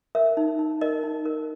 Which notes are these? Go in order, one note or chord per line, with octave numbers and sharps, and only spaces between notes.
A#4 E5
D#4
D#4
A#4 D#5
D#4
A#4